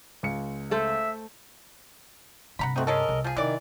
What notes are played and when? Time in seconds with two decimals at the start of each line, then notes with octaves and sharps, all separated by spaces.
0.23 C#2 C#7
0.71 A3 A4 C5 E5
2.59 G2 C3 F#5 A#5 B5
2.76 A3 C4 D#4 F#4
2.87 G#3 C#4 A4 A#4 D#5
3.09 C2
3.24 F3 G#4
3.37 C3 D#3 E3 D5